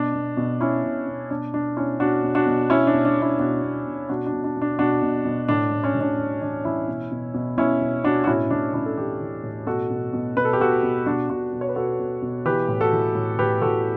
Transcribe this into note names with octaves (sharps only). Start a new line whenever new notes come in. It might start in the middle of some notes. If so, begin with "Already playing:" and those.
Already playing: B2 D4
B2
B2
B2 C#4 E4
B2
B2
B2 D4
B2 D4
B2 C#4 E4
B2 D4 F#4
B2
D4 F#4
B2
B2 C#4 E4
D4
B2
D4
B2
C#4 E4
B2 D4 F#4
B2
B2
B2 D4 F#4
D4
B2
D4
B2
D4
B2 D4 F#4
B2
B2
A2 D4
A2
C#4
A2
D4
A2
E3 D4
E3 C#4 E4
B2
B2
B2
B2 C#4 E4
B2
B2 D4 F#4
F#4
A2 C#4 E4
A2 D4
A2 C#4 E4
A4
E3 E4 G4
E3
A2
B2 F#4 A4
B2
B2
B2 B4
A4
G4
B2 F#4 A4
B2
B2 D4 F#4
B2 D4 F#4
B2
C#5
B4
B2 F#4 A4
B2
B2
E3 G4 B4
A2
F#4 A4
E3
A2
A2 G4 B4
A2 F#4 A4